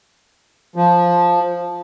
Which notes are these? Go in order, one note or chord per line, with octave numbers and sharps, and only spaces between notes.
F3